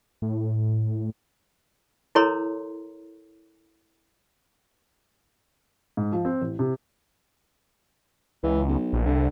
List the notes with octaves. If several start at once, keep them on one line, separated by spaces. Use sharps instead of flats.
A2
E4 A4 A#4 C#5 A#5 C6
G#2
F3
C4
A1
C3
C#2 E3
B1
A#1
C2 D3